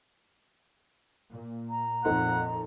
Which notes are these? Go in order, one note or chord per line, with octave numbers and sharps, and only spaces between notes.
A#2
A#5
F2 A#2 C4 D#4 A4 F#5